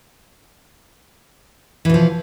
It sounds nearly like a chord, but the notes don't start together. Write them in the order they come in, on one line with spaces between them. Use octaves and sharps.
E3 B2 F3